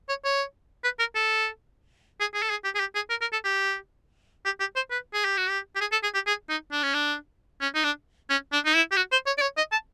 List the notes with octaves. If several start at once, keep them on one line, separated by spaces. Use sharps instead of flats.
C#5
C#5
B4
A#4
A4
G#4
G#4
A4
G#4
G4
G#4
G4
G#4
A#4
A#4
A4
G4
G4
G4
C5
B4
G#4
G4
F#4
G4
G4
G#4
A4
G#4
G4
G#4
D#4
D4
C#4
D4
C#4
D#4
D4
C#4
D4
D#4
E4
G4
F#4
C5
C#5
D5
C#5
D#5
A5